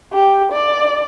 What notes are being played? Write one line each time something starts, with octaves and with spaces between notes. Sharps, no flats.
G4
D5